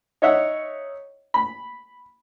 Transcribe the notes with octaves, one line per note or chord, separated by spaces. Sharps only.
D#4 C#5 E5 F#5
B5